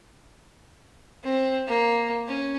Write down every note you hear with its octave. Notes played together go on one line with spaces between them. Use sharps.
C4
A#3
C#4